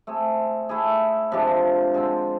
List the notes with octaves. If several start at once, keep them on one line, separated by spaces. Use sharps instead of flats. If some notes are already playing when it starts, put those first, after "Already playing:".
A3 C4 G#4
A3 E4 G#4
C3 F3 G#3 D4
D3 G#3 C4